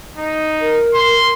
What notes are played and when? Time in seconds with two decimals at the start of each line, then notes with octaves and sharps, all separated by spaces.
0.17 D#4
0.61 A#4
0.94 C6